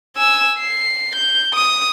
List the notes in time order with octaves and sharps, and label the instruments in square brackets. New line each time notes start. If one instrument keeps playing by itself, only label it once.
[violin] G#5 E6
C7
G6
D#6